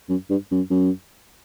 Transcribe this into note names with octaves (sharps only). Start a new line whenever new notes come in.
F#2
G2
F#2
F#2